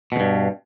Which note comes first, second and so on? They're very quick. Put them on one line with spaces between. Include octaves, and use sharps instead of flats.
B2 E2 G2